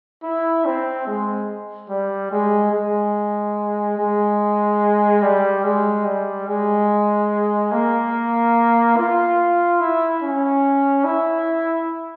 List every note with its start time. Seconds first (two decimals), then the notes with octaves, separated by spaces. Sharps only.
0.23 E4
0.65 C4
1.07 G#3
1.89 G3
2.31 G#3
2.72 G#3
3.98 G#3
5.22 G3
5.64 G#3
6.05 G3
6.47 G#3
7.72 A#3
8.97 F4
9.81 E4
10.22 C#4
11.04 E4